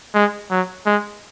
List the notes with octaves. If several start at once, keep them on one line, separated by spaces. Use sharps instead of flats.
G#3
F#3
G#3